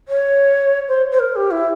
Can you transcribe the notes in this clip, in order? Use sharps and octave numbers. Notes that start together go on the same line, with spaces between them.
C#5
C5
C5
A#4
G4
E4